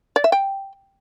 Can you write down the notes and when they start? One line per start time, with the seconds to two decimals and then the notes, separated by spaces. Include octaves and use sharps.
0.16 D5
0.24 E5
0.32 G5